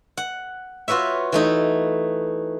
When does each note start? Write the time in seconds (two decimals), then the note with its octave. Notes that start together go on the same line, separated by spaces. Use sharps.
0.17 F#5
0.88 F4 F#4 B4 C#5 E5
1.32 E3 A3 D#4